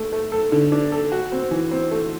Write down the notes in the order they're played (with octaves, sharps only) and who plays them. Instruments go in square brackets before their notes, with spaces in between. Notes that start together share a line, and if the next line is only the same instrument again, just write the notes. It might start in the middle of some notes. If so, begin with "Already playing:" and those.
Already playing: [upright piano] A3
A3
A4
D3
D4
A4
F#4
C4
E3
C4
A3